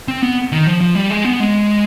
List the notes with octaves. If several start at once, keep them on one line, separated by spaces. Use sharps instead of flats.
C4
B3
D#3
F3
F3
G3
G#3
B3
G#3